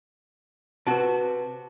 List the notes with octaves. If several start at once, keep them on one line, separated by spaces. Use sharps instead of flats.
C3 F#4 B4 A5